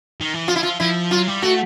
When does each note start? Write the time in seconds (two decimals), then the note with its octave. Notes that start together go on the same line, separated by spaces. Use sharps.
0.21 D#3
0.34 E3
0.48 F3 F4
0.56 E4
0.63 F4
0.80 F3 E4
1.11 F#3 F4
1.28 G3
1.42 A3 F#4